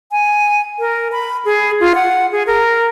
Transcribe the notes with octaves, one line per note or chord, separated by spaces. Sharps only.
G#5
A#4
B5
G#4
F4
F#5
G#4
A#4